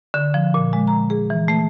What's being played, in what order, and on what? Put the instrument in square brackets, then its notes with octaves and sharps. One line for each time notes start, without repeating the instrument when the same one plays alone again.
[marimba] D3
F3
A#2
G#3
A#5
G#4
E3
A3